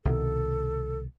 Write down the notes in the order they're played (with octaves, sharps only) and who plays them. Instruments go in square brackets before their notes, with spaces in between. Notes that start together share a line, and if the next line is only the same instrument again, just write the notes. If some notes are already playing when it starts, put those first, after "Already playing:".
[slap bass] C2 B2 D#3 [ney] A4